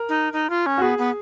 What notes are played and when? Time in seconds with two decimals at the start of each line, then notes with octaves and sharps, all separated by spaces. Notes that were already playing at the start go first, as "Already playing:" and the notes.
Already playing: A#4
0.09 D#4
0.33 D#4
0.50 F4
0.66 C#4
0.78 F#4
0.82 B3 G#4
0.98 B3